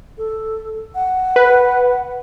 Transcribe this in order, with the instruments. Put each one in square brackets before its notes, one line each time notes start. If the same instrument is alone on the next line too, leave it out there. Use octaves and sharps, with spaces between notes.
[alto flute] A4
F#5
[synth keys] B4